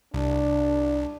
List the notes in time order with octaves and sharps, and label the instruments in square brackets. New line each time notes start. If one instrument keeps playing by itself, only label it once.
[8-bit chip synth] C2 [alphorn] D4